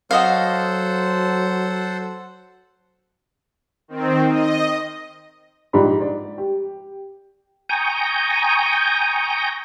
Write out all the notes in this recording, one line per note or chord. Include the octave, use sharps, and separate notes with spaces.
F#3 F#4 A4 C5 D#5 F5 F#5
D#3 C4
D#5
A#1 G#2 F3 G4 D5 B5
D5
G4
G5 G#5 A#5 C#6 D#6 G6